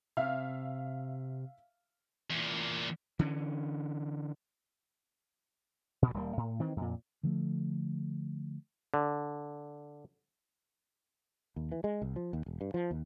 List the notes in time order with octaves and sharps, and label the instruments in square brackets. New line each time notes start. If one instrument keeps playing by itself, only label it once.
[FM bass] C3 [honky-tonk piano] E5 F5 F6
[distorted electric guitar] E2 A#2
[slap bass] D3 E3 C#4
D2 A#2
D#1 G3 A#3
A2
D#3 E3 C4
F2 A#2
[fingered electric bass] D3 F3 A3
[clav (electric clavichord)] D3
[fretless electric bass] D#2
E3
G#3
C2
F3
D#2
E1
G2
F3
D#2